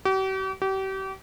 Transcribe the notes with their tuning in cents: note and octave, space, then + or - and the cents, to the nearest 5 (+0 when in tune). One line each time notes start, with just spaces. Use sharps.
G4 -45
G4 -35